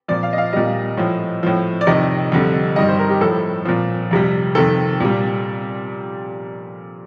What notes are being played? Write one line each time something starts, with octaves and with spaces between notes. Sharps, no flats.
A#2 F3 D5
F5
D#5
F5
A#2 G3 D#5
A2 F3
A2 F3
D5
F2 C3 D#3 D#5
F2 D3 G3
G2 D#3 G3 D#5
C5
A#4
G4
A2 F3 A4
A#2 F3
F2 C3 G3
F2 C3 D#3 A4
A#2 G3